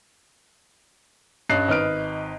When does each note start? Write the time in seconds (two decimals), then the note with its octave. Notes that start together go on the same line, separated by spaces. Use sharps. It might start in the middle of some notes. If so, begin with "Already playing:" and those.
1.49 G2 C#4 D#5 F#6 C7
1.68 G#1 D#4 B4 F6 D7